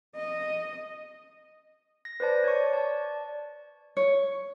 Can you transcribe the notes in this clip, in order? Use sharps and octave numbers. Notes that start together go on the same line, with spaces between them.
D#5
A#6
B4 C5 D5 A5
C#5 D5 C#6
D5 A5
C#5